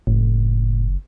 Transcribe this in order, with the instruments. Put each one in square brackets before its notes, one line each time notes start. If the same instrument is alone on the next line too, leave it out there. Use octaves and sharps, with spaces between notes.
[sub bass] F#1 [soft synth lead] A2